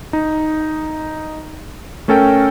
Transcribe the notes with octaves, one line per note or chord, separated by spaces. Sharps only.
D#4
A3 C#4 A4 A#4 G5